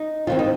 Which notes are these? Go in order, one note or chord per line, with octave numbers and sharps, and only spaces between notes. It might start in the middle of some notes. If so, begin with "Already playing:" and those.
Already playing: D#4
D#2 D#3 C4 F4
D#4